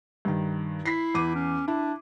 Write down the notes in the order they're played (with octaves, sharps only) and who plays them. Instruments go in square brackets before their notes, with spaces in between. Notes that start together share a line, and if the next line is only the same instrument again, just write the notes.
[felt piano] G2 D#3
[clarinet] E4 [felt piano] B6 C7
[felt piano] E2 D6 D#7
[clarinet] C#4
[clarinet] D4 [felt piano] E4